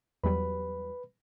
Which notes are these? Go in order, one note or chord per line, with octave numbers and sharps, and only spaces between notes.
E2 F#3 G3 B4 B5